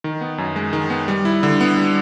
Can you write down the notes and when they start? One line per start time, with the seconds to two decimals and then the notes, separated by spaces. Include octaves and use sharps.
0.04 D#3
0.21 B3
0.38 F#2
0.56 G#3
0.73 D#3
0.90 B3
1.08 G3
1.25 E4
1.43 D3
1.61 B3
1.77 G3